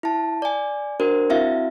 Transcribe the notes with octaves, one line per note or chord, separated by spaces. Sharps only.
E4 A5
D5 G#5
D4 F#4 A#4 C5
C4 E4 F#4 E5 F5